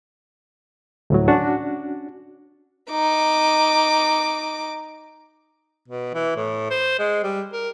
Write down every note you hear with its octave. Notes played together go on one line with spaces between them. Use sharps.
D2 A2 F#3
C#4 D4 F#4
D#4 D6
B2
E3
A2
C5
G#3
G3
A#4